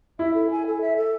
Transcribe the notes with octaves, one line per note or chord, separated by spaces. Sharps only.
E4 E5
A4
G#5
A4
E5
A4